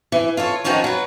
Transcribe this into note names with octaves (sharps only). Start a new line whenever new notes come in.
E3
F4 A4 C#5
D#3 F3 F#3 C#4 F#4
F#3 B4